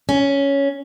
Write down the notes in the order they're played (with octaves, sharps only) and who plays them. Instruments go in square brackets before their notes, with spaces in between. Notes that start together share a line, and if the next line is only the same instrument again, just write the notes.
[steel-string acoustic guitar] C#4